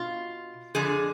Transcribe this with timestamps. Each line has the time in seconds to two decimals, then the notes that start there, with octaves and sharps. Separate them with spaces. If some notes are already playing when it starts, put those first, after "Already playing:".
Already playing: B2 F4
0.75 F2 D3 F3 G#4